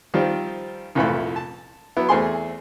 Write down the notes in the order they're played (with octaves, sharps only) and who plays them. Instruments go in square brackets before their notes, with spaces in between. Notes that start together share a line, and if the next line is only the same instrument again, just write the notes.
[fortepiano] D#3 F3 G3 C4 F4
C2 F2 A#2 E3 A3 B5
A5
F#3 B3 E4
E2 A3 C4 G#4 C6